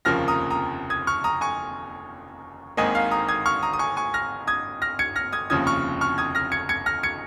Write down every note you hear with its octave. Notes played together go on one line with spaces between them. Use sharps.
F1 D#2 C#3 F3 A#3 F6 A#6
A#5 D#6
A#5 D#6
D#6 G#6
C#6 F6
A#5 D#6
G#5 C#6
G#1 G#2 D#3 A#3 D#5 G#5
F5
A#5 D#6
D#6 G#6
C#6 F6
A#5 D#6
D#6
G#5 C#6
G#5 C#6
F6 A#6
D#6 G#6
F6 A#6
G#6 C#7
F6 A#6
D#6 G#6
F1 D#2 C#3 F3 D#6 G#6
C#6 F6
C#6 F6
D#6 G#6
F6 A#6
G#6 C#7
G#6 C#7
F6 A#6
G#6 C#7